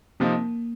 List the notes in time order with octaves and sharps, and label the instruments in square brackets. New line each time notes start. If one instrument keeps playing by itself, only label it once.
[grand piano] C3 F3 C4 D#4 [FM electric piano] A#3